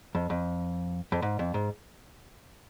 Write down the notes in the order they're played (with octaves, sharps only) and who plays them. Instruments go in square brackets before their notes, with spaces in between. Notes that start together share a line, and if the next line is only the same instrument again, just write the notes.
[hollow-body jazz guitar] F2
F2
F2
G#2
F2
G#2